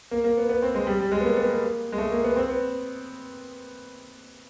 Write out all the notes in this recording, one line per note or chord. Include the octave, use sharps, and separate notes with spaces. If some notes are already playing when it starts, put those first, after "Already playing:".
A#3
A#3
B3
B3
C4
G#3
G3
G3
G#3
B3
A#3
B3
A#3
G#3
A3
A#3
B3
C4
B3